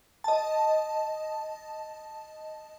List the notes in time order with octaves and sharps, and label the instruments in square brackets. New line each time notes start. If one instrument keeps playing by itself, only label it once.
[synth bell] D#5 A5